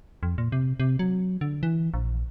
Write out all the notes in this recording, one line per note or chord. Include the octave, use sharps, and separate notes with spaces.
F2
A#2
C3
C3
F#3
D3
E3
A#1